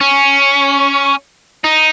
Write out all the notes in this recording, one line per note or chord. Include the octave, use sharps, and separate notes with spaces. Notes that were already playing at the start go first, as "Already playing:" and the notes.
C#4
D#4